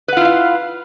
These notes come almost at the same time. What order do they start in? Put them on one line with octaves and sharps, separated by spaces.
B4 F#5 F4 E4 F5